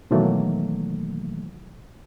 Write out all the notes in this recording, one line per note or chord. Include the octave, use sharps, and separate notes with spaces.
B2 D#3 E3 F#3 A3 A#3